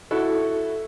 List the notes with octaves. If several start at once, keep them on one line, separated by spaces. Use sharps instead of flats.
E4 F#4 A4